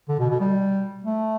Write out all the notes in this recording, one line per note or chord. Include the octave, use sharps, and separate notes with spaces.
D3
B2
B2
G3
A3